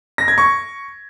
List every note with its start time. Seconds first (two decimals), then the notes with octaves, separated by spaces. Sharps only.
0.18 A#6
0.28 G#6
0.38 C#6